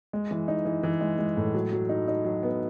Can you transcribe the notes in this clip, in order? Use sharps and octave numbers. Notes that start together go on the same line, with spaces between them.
G#3
E3
D#4
E3
E3
G#3
G#3
A2
F#3
F#3
D#4
D#4
F#3
B3